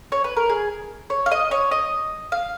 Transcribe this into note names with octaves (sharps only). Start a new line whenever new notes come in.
C#5
B4
A#4
G#4
C#5
F5
D#5
C#5
D#5
F5